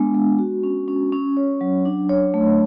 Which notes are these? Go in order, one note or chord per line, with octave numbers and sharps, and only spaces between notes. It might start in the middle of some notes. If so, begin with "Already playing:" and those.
Already playing: G#3 B3 D4
G#3
F#4
C#4
C#4
C#4
C#5
F#3
D4
C#5
A3